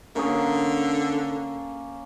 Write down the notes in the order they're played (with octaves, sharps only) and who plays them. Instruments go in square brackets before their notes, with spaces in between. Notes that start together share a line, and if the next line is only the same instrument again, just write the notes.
[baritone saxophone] D3 [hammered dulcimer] A#3 C#4 G#4